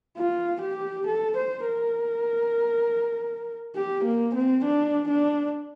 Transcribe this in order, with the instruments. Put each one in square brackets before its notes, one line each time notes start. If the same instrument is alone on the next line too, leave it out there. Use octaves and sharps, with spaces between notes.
[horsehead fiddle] F4
G4
A4
C5
A#4
G4
A#3
C4
D4
D4